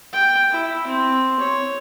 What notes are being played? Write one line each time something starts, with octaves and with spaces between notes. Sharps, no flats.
G5
E4
C4
C#5